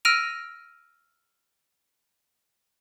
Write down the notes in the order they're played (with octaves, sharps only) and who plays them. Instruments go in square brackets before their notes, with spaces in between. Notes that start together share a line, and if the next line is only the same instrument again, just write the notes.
[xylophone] E6 F6 A#6 D7 D#7 F7